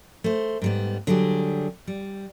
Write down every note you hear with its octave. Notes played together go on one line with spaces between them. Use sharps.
A3 C5
G#2 G3 B3
D3 F#3 G3 G4 G#4
G3